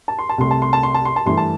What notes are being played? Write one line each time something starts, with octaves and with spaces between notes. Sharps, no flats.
A5
C6
A5
C2 C3 A3 C6
A5
C6
A5
C6
A5
C6
A5
G2 E3 A3 C6
A5